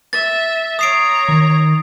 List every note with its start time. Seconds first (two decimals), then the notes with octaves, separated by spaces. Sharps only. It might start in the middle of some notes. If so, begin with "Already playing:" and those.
0.13 E5 A6
0.79 C#5 A#5 D#6 C7 D7
1.28 D#3